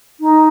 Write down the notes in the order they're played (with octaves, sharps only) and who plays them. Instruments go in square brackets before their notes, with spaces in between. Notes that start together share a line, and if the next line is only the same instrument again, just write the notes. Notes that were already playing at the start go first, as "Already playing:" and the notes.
[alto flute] D#4